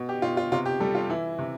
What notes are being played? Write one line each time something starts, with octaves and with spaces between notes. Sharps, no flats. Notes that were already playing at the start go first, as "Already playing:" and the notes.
Already playing: B2
G4
B2 F4
F4
C3 F4
G4
G3 A4
F4
E3 E4
C3